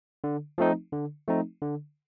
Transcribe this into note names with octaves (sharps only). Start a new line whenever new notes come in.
D3
F3 A3 C4 D#4
D3
F3 A3 C4 D#4
D3